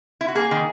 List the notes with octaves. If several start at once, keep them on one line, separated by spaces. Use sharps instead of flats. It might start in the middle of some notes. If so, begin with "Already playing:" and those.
E4
F#4
A#3 G#4
D#3